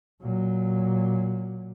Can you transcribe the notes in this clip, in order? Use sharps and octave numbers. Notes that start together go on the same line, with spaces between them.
A#2 F#3